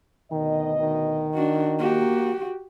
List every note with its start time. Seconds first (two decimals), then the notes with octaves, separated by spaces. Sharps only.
0.32 D2 B2 D#3 D#5
0.79 D#3
1.34 D4 F#4
1.79 A#3 F#4 G4